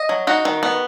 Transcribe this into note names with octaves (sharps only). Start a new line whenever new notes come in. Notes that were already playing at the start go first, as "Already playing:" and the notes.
Already playing: D#5
F#3
D#4 F#4
D#3
B3